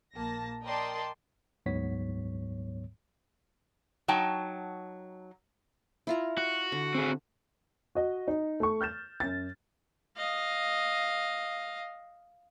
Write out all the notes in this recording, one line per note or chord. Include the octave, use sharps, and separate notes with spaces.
A#1 A#3 A5 A#6
A#4 D5 D#5 G5 A5 C6
D2 G#2 F#3 B3 C#5 B6
F#3 D#4 G5 A5
E4 F4 A#5
F#4
D3
C4 G#4
F#4 D#5
D#4
A3 C#6
F6 G6 A6 E7
F#2 A6
D#5 F5